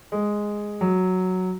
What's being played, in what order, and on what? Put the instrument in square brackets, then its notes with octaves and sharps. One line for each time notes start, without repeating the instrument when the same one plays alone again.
[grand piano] G#3
F#3